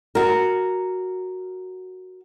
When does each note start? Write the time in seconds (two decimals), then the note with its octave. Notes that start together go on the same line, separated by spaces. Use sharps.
0.15 F#4 A#4